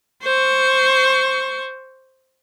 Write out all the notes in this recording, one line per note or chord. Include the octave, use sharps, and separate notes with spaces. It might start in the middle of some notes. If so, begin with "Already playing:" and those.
C5 C#6